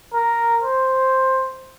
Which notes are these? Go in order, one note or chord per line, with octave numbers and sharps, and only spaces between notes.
A#4
C5